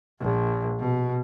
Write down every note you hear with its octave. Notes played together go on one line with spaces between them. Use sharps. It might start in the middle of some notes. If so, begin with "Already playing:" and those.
A#1
B2